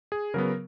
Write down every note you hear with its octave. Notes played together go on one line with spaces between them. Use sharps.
G#4
C#3 F#3 B3 A#4